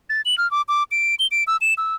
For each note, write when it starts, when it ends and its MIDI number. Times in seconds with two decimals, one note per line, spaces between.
0.09 0.21 93
0.25 0.38 102
0.38 0.50 89
0.51 0.62 86
0.69 0.83 86
0.91 1.15 98
1.19 1.27 103
1.31 1.44 98
1.47 1.57 88
1.61 1.74 100
1.78 1.95 88